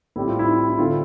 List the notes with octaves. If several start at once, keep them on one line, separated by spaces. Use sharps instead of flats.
A2 G3 C4 E4
F4
E4
E4
D3 A3 C4 F4